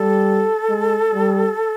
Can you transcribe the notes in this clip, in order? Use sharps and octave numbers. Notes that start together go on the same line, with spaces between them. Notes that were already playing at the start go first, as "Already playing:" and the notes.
Already playing: G3 A4
G#3
G3